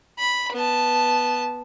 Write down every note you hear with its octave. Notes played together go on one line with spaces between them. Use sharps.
B5
B3 A5